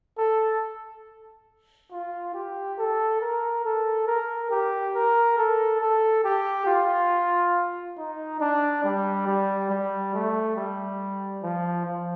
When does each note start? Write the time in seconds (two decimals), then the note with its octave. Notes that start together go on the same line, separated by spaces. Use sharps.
0.18 A4
1.91 F4
2.34 G4
2.78 A4
3.21 A#4
3.64 A4
4.07 A#4
4.51 G4
4.94 A#4
5.38 A4
5.80 A4
6.24 G4
6.67 F4
7.97 D#4
8.40 D4
8.84 G3
9.27 G3
9.70 G3
10.14 A3
10.56 G3
11.43 F3
11.86 F3